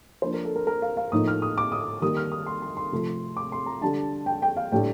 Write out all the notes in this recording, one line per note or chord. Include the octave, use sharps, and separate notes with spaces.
F3 A#3 D4 C5
A#4
A4
A#4
A#4
F5
F5
A2 F3 A#3 D#4 D#6
F6
D#6
D6
D#6
D#3 G3 A#3 D#6
F6
D#6
C6
C6
C6
C3 F3 A3
D6
C6
A#5
D3 G3 D4 A5
G5
G5
F5
A2 G3 D4 G5